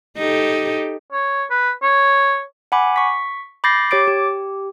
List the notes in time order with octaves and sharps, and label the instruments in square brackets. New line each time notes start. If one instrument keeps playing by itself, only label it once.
[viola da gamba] D#4 G4 A4
[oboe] C#5
B4
C#5
[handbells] F#5 G#5 B5 D6
C#6 B6
B5 D6 G6 A6 A#6 C7
G4 C#5 D6 A6 D7
G4